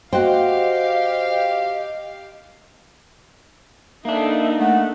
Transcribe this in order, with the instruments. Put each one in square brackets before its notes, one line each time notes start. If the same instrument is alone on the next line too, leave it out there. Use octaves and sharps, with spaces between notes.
[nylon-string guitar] F#4 G5 [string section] G4 F5 [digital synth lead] C5 [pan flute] D#5
[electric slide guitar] A#3 D4 [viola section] D#4 A4 [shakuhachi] E5
[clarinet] A3 [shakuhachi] F#5